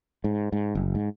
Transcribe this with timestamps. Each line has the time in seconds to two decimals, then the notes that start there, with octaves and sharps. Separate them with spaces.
0.24 G#2
0.52 G#2
0.75 F#1
0.95 G#2